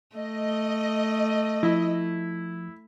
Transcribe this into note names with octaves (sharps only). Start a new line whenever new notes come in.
A3 D#5
F3 E4